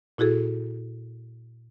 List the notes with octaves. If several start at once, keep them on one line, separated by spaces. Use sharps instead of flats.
A#2 E4 F#4 G#4 A4